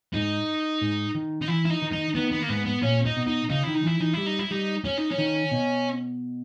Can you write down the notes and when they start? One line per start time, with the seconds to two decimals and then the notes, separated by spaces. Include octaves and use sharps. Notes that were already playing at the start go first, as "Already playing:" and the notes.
0.13 G#2 D#4
0.81 G#2
1.15 D#3
1.42 D#4
1.48 E3 E4
1.65 E4
1.70 D#4
1.82 D#3
1.93 D#4
2.15 D#3 B3
2.32 B3
2.42 A#3
2.49 G#2 B3
2.66 B3
2.82 A#2 C#4
3.05 D#4
3.17 B2
3.27 D#4
3.50 C#3 D#4
3.63 D#3 E4
3.75 D#4
3.84 E3 E4
4.00 E3 D#4
4.14 G3 E4
4.26 D#4
4.39 E4
4.51 G3 D#4
4.85 C#4
4.98 D#4
5.11 C#4
5.18 D#3
5.51 B2